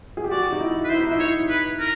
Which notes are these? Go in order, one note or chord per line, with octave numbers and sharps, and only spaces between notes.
G#4
G4
F#4 D5
D#4
E4
B4
E4 C5
D#4
E4
C#5
B4
A#4